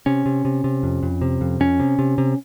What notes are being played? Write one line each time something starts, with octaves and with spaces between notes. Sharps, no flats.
C3 C#4
C3
C3
C3
F2
F2
C3
F2
F2 C#4
C3
C3
C3